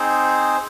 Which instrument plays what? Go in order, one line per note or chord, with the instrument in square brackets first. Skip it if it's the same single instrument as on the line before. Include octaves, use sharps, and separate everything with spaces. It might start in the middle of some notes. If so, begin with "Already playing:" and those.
Already playing: [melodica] C4 D#4 G#4 C5